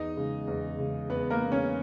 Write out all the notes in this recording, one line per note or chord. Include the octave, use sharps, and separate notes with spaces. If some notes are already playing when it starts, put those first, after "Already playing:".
Already playing: E2 D#4 D#5
C#3 G#3
E2
C#3 G#3
E2 B3 B4
A#3 A#4
C#3 G#3
C#4 C#5